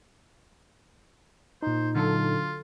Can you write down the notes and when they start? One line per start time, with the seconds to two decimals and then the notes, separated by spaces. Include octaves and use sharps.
1.63 A#2 D#4 C5
1.95 D3 F#3 F4 A4